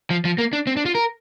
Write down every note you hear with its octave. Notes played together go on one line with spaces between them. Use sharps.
F3
F3
A#3
D4
C4
D4
F4
A#4